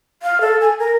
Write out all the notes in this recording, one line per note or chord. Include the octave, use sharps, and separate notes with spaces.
F5
A4
G#5
A#4